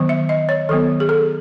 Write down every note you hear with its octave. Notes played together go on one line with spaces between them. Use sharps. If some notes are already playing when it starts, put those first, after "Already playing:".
Already playing: D#3 F#3 B3
E5
D#5
C#5
D#3 F#3 B3 A4
G#4
A4